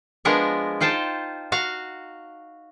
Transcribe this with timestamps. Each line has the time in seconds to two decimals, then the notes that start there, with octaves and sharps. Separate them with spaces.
0.25 F3 G#3 B3 D4 A#4 C#5
0.80 D#4 F4 C5 G5 A5
1.52 F#4 F5 A#5